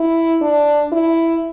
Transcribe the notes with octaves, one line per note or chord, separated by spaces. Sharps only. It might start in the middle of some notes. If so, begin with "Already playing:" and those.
Already playing: E4
D4
E4